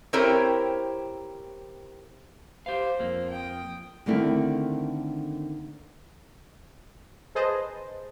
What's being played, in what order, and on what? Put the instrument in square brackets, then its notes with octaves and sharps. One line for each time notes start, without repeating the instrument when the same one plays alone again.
[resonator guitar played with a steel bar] C4 E4 G4 A#4 C5 C#5
[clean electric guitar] G4 F5 [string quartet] C5
[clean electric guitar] F2 F3 A#3
[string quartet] G5 D#6
[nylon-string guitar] D3 D#3 A3 A#3 C4 E4
[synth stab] G#4 B4 C5 D#5 A5